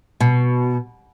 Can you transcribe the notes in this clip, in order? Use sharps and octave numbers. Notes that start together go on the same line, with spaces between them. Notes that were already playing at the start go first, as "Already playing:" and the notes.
B2